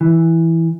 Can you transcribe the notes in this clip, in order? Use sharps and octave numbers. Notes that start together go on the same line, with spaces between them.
E3